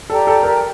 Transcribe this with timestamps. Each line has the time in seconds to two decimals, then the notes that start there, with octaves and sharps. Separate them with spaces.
0.10 G4 A4 D5 G5 A#5
0.27 A4
0.43 A#4